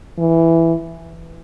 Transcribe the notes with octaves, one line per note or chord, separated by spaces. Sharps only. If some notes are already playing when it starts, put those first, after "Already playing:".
E3